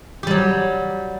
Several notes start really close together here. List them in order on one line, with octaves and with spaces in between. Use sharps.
G4 G3 F#3